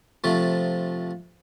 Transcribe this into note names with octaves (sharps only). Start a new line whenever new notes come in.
C3 F3 A3